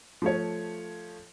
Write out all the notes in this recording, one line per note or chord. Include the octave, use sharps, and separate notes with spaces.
F3 A3 C#5